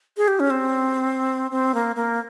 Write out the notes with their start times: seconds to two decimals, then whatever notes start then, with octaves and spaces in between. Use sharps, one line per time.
0.17 G#4
0.28 G4
0.40 C#4
0.50 C4
1.51 C4
1.74 A#3
1.96 A#3